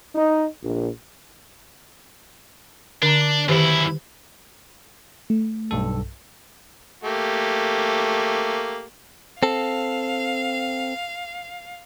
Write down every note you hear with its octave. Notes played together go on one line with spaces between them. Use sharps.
D#4
A#1
D3 D4 A#5
F#2 D#3 E4 G4 C5
A3
B1 G2 A4
A3 A#3 G4
C4 A4 F5